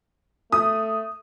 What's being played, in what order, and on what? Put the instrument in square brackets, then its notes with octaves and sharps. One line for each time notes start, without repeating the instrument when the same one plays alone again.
[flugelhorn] A3 [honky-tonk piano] D#6